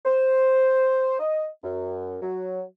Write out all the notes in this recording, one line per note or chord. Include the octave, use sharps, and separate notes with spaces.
C5
D#5
F#2
F#3